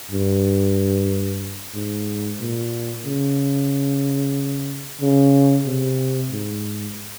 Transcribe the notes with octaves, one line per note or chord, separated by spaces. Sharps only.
G2
G#2
A#2
C#3
C#3
C3
G#2